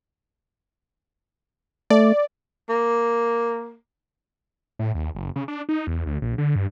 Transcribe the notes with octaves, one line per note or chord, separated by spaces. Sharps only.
A3 D5
A#3
A2
D#2
F#1
C#3
D4
D#4
E2
D2
A#1
D3
G2